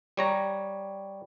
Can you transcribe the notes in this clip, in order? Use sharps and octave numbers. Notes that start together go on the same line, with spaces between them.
G3 C#5 A#5